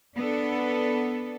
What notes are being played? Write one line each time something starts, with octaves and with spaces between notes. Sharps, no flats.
B3 D4 A4